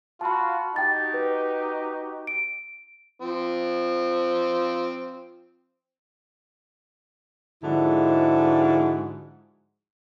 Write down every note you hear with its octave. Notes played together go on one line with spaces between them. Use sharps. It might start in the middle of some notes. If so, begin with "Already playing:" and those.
F4 F#4 F5 A5 B5
D#4 F#4 G4 G5 A6
B4
D7
F3 C4
G#2 D3 F3 G#3 E4 F#4